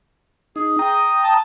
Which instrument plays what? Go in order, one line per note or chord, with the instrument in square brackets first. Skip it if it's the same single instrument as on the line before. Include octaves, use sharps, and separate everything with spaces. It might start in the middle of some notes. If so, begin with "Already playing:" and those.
[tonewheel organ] D#4 [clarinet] G#4
[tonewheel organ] G5 A#5 D#6
[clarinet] A5